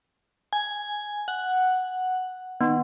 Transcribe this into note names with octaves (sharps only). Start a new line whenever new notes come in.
G#5
F#5
D#3 B3